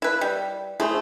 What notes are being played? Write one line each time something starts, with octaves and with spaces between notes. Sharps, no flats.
E4 B4
G3
A3 E4 G#4 C5